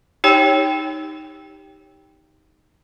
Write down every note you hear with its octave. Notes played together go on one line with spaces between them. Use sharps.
D#4 G4 C#5 G5